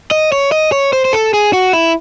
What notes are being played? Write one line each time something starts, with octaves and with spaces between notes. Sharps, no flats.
D#5
C#5
D#5
C#5
C5
C5
A4
G#4
F#4
E4